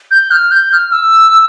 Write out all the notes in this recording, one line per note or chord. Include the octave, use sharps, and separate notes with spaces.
G6
F6
G6
F6
E6